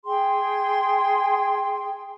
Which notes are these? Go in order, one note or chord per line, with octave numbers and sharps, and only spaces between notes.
G#4 G5 C6